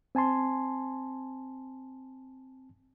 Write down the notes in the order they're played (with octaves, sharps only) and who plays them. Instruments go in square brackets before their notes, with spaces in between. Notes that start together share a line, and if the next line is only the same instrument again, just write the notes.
[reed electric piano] C4 G#5 A5 C6